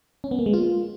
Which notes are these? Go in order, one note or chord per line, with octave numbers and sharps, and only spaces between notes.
C#4
B3
A#3
G#3
F4